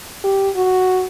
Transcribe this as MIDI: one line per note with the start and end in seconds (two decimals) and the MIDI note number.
0.24 0.50 67
0.56 1.07 66